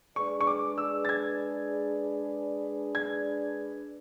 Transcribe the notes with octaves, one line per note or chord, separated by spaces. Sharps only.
G#3 D4 G#4 B4 D5 C#6
C#6
D6
E6
A6
G#6
G#6